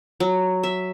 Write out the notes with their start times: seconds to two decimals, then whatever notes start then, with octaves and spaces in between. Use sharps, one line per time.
0.20 F#3
0.63 E5